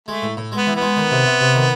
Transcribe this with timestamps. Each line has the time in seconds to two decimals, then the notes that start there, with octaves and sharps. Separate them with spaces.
0.08 G#3 A3
0.23 A2
0.37 A2
0.52 G#3 B3
0.67 E3
0.76 B3
0.82 G#3
0.96 D#3
1.11 C3
1.25 C3
1.41 C3
1.55 D#3